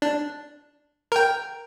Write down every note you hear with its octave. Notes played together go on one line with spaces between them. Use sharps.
D4
A#4 G5